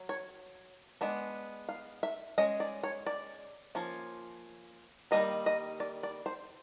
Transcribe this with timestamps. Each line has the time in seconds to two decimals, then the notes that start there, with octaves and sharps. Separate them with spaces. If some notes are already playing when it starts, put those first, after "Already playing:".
Already playing: F#3
0.09 C#5
1.01 G#3 B3 D4
1.69 F5
2.03 E5
2.38 G#3 C#4 D#5
2.60 D5
2.83 C#5
3.06 D5
3.75 F3 A#3 C#4
5.11 D#3 G3 A#3 D#4 D#5
5.46 D#5
5.80 D5
6.03 D5
6.26 C5